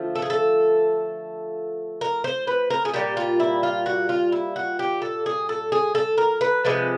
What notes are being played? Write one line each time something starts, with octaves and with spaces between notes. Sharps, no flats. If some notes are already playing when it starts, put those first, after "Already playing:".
Already playing: D3 F3 A3
A4
G#4
A4
A#4
C5
B4
A#4
G#4
A#2 G3 G4
F4
E4
F4
F#4
F4
E4
F#4
G4
A4
G#4
A4
G#4
A4
A#4
B4
C3 F3 G#3 B4